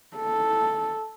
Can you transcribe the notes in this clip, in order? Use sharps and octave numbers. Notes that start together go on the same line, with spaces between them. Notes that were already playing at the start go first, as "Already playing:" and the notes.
A4